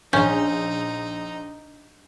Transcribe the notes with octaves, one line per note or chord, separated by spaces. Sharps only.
A#1 C#4 D#4 G6